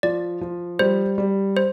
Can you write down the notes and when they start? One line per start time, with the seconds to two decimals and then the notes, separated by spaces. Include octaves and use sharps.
0.03 F3 D5
0.41 F3
0.79 G3 C5
1.18 G3
1.57 C5